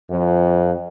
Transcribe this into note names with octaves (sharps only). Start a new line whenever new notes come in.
F2 F3